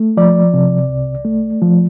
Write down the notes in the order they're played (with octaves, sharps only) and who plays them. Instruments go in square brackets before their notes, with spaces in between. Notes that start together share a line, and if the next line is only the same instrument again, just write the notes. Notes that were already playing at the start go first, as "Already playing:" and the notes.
Already playing: [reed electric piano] A3
F3 D5
C3
C2
A3
F3